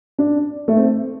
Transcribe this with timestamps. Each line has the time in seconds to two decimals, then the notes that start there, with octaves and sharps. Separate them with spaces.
0.19 D4
0.68 A3
0.77 C4